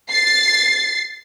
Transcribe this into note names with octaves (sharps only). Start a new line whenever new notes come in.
A6 C7